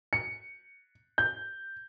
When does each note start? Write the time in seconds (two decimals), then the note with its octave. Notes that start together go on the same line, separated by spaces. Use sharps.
0.13 C#7
1.18 G6